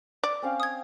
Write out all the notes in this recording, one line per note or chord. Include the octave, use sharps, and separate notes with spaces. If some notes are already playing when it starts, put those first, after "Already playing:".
D5
C4 C#4 F5
D#6 G#6